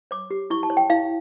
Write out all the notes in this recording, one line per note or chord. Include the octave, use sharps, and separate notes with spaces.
C#5 D6
G4
E4 C#6
A5
C#5
G5
E4 F5